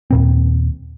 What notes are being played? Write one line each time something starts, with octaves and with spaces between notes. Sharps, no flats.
D#2 A#2 C4